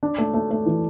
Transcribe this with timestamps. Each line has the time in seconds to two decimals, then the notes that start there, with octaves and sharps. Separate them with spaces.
0.03 D4
0.18 A3
0.34 A3
0.51 A3
0.66 E3